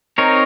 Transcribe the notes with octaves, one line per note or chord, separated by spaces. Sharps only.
C4 D#4 A#4 C#5